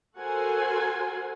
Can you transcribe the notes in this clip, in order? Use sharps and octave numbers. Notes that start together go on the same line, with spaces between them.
F#4 A4 A#4 C5 F#5 G#5